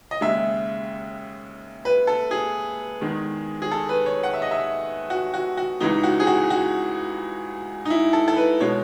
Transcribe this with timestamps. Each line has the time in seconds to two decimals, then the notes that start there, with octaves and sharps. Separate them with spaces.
0.11 D#5
0.21 D#2 C#3 G#3 E5
1.85 B4
2.07 A4
2.31 G#4
3.01 E2 D#3 G#3
3.62 G#4
3.71 A4
3.89 B4
4.06 C#5
4.23 F#5
4.33 E5
4.42 D#5
4.51 E5
5.10 F#4
5.34 F#4
5.58 F#4
5.80 C#2 C#3 E3 G#3 D#4
6.03 F#4
6.20 G#4
6.27 F#4
6.50 F#4
7.85 D#4
7.90 E4
8.13 A4
8.28 A4
8.36 B4
8.60 B2 G#3 C#5